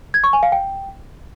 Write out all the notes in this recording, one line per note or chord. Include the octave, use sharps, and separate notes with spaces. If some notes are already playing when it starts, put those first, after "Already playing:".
G#6
C#6
G#5
F5
G5